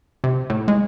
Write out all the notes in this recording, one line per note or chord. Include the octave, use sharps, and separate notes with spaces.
C3
A2
G#3